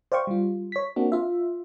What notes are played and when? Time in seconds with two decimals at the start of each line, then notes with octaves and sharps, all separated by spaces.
0.12 C5 D5 F5 G5 C#6
0.27 G3 F4
0.72 C#5 B6
0.96 A#3 C4 D4 F#4
1.12 F4 E5